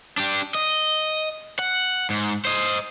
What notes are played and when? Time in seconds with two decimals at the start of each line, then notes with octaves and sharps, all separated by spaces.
0.17 D4 G4
0.55 D#5
1.59 F#5
2.10 G#2
2.45 C5 D#5